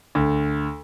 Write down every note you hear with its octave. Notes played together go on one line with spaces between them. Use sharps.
D2